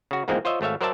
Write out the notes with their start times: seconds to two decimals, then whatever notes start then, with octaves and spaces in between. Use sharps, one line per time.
0.11 C#3 F#4
0.28 E2 G#2 F3 G#3 A#3 C4
0.45 F4 C5 C#5 D#5 E5
0.61 G#1 A3 C#5 E5 F5
0.81 F#3 A#4 C5 D5 E5 A5